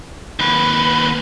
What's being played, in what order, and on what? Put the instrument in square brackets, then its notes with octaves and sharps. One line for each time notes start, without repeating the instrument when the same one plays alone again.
[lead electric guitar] D#2 B4